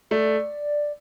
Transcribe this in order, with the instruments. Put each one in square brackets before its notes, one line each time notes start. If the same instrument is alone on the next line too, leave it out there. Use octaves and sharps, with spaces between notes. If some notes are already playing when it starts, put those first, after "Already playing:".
[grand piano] A3 [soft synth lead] D5